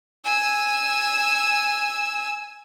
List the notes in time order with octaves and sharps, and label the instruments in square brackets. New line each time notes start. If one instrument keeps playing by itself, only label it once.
[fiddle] G#5 E6